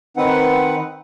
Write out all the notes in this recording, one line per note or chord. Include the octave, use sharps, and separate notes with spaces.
D#3 C4 D#4 B4 F#5